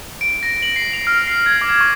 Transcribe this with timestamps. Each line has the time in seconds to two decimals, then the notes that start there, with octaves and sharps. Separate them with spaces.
0.21 D7
0.43 A#6
0.62 F#7
0.76 C7
0.93 F7
1.07 F6
1.27 C7
1.46 G#6
1.61 D6
1.81 C#6